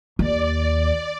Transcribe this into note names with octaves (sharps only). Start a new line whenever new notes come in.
D#2 D5